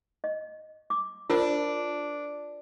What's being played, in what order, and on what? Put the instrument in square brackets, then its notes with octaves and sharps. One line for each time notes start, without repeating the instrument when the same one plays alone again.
[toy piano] D#5
D6
[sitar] D4 [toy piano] F4 A#4 C5